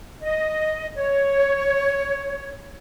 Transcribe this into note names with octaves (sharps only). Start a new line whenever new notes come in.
D#5
C#5